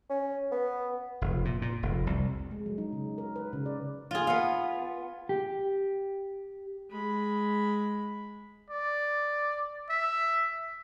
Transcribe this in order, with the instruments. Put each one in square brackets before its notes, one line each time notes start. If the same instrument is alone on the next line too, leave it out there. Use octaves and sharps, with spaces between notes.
[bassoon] C#4
B3
[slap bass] F1
A#2
A#2
F1
C2
[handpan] G#3
F#3
D#4
C#3
A#4
B4
C#3
D5
[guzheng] F4 G#4
B3 F5
[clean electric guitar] G4
[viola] G#3 B5
[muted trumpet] D5
E5